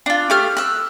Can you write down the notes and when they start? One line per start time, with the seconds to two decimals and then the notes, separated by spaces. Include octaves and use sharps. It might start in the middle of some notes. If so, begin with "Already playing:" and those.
0.06 D4 F4
0.30 A3 G4 F6
0.57 E6 F#6